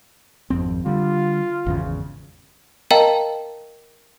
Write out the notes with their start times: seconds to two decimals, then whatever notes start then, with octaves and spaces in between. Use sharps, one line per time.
0.50 G#1 F2 C4
0.86 D3 G3 F4
1.66 G#1 E2 C#3
2.91 A#4 D#5 F5 G5 A5 A#5